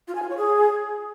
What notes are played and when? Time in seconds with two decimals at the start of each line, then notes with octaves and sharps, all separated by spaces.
0.08 F4
0.15 G#5
0.23 F4
0.30 C#5
0.37 G#4